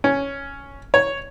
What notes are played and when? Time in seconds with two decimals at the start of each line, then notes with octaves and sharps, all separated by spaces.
0.04 C#4
0.94 C#5